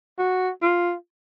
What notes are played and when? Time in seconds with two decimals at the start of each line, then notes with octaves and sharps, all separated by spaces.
0.18 F#4
0.62 F4